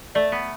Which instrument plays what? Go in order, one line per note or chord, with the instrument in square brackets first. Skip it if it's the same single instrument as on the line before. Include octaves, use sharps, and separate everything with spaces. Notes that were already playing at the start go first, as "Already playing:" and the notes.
[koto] A3 [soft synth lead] D5
[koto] B3